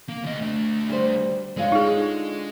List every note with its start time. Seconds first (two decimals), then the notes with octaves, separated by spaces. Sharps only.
0.08 A#3
0.24 D2 D#5
0.41 D3 A3
0.90 G3 C5
1.57 D3 G#3 F4 C#5
1.72 D#4 G#4